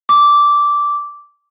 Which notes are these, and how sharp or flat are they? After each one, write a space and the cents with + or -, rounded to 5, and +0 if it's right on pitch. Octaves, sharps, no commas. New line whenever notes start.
D6 -10